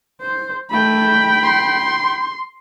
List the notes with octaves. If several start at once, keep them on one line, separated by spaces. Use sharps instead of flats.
C5
A3 G5 B5
C6